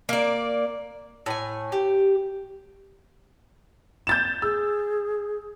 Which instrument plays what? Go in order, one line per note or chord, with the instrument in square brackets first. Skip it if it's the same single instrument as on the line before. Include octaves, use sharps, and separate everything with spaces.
[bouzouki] A#3 D5
A2 G#5
G4
[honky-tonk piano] G6 A6 E7
[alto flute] G#4 [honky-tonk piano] E6